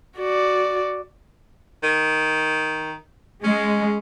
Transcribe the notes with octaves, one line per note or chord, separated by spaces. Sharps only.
F#4 D5
D#3
G#3 C#4